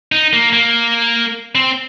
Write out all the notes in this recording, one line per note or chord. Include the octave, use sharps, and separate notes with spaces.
D#4
A#3
A#3
C4